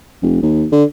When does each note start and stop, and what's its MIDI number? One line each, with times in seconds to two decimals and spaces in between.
0.22 0.39 29
0.42 0.65 39
0.72 0.84 50